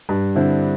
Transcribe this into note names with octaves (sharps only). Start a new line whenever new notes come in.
G2
D3 C4 E4